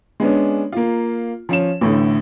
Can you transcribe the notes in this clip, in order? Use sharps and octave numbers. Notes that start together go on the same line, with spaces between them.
G#3 B3 C#4 D4
A#3 F4
F3 C#4 E7
A1 A2 D3